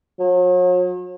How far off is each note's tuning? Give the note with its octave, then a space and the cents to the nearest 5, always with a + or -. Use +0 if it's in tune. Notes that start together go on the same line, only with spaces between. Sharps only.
F#3 -40